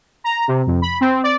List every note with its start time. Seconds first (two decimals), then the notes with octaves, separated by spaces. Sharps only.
0.24 A#5
0.48 C3
0.67 F2
0.82 B5
1.01 C4
1.23 D5